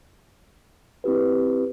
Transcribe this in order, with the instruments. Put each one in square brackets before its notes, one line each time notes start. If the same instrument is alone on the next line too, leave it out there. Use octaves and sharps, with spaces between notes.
[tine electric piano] C4 E4 G4 B4